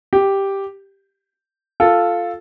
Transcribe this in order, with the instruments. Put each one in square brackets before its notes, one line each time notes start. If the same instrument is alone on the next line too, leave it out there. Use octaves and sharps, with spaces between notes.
[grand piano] G4
F4 A4